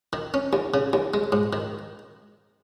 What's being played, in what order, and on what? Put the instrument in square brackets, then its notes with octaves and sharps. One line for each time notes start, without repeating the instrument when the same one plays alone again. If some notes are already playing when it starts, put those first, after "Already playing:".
[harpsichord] D#3
C#4
D#2
C#3
D#2
G#3
G#2
D#3